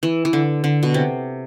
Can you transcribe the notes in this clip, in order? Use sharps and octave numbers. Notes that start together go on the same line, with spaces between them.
E3
E3
D3
D3
B2
C3